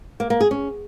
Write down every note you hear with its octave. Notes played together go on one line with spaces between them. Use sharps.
A#3
A#3
G#4
C#4